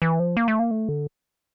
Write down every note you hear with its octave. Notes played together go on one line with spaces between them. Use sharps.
E3
F3
A#3
A3
A#3
A3
D3